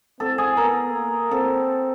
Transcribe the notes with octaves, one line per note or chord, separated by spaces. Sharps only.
C4 A4
G#4
B3 A#4
A#3
C4 A4